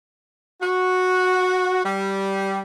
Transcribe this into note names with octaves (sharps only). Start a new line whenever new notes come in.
F#4
G3